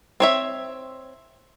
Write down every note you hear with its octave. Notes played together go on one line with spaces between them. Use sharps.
C4 C#5 E5